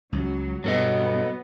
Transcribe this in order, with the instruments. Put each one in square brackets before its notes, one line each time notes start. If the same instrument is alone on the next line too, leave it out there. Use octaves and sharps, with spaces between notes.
[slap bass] C#2 [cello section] F#3
[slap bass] G2 B2 [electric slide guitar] F#3 A4 D#5 [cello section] B3